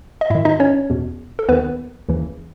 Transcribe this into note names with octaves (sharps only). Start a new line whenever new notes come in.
D#5
G#2 D#3 E4 E5
D#4 D#5
C#4 C#5
E2 B2
A4
D#2 D#3 B3 B4
D#2 C#3 E3